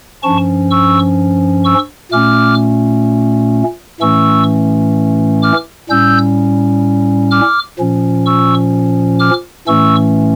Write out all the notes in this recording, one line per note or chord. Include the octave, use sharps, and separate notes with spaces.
G2 F3 C#4 A5 C#6
C#6 E6
C#6 E6
A#2 A3 C#4 D6 F6
A2 E3 A3 C#4 C#6 E6
D6 F6
A2 G3 C#4 E6 G6
D6 F6
A#2 F3 C#4
C#6 E6
D6 F6
A2 E3 A3 C#4 C#6 E6